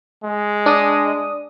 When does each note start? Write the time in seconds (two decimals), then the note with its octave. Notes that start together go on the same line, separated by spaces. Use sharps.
0.24 G#3
0.66 D4 D#6